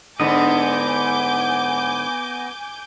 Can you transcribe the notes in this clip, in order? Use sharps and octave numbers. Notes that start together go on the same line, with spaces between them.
G#2 D3 B3 D#5 G#5 D6 G6